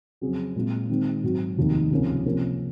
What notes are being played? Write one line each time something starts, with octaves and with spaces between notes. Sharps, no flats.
F2 C#3 F#3 C#4 G#4
A#2 G#3 C4 F4
D#3 G#3 C4 D#4
G#2 F#3 C4 F#4
F1 D#2 D#3
C#2 C3 F3 A#3 C#4
C3 F3 A#3 C#4